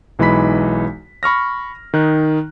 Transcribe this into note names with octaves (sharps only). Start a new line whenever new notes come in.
B1 E3 G#3 D#4 B5 B6
B5 C#6 F6 A#6
D#3 D#4 F#6